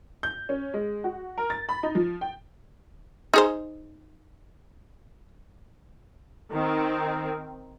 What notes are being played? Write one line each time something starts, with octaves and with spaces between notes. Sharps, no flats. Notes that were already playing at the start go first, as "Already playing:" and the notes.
G6
C#4
G#3
F#4
A#4
A6
B5
D#4
F3
G5
D#4 G#4 C5
D#3 C4